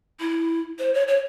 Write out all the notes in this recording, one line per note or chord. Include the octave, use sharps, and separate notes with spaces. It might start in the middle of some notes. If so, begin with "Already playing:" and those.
E4
C5
C#5
C#5